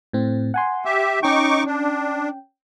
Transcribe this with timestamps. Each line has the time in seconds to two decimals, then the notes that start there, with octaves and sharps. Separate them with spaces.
0.13 A2 C4
0.54 F#5 G#5 C6
0.85 G4 E5
1.23 C#4 D#4 G5 C#6 D6
1.66 D4